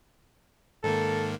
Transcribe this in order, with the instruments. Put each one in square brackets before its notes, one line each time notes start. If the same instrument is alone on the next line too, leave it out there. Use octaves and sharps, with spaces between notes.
[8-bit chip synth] G#2 D#3 A#3 [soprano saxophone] A4